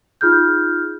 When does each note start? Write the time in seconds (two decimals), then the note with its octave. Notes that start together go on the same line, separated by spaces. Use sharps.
0.21 D#4 F4 G#4 F6 G6